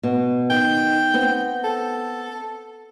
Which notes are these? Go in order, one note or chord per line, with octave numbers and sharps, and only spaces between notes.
B2
D#3 G5
B3 C4
A4